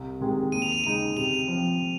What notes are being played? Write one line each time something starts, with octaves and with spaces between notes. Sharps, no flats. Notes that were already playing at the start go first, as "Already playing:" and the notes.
Already playing: C2
C3 D#3 G#3
D#2 D#7
F7
D#7
C#3 G#3 D#4 D#7
C3 F7
F3 C4